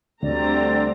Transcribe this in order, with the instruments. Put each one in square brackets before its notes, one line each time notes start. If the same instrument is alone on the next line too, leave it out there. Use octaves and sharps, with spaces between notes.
[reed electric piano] D2 [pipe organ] D3 C4 [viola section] G3 A3 A#5 [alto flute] D5